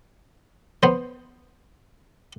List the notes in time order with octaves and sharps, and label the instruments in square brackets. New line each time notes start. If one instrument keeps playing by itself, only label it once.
[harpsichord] B3 C5